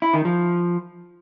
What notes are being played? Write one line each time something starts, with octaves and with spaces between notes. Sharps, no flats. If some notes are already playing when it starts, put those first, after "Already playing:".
E4
D#3
F3